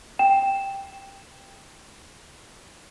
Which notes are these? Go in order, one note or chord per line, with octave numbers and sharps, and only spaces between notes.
G5 E7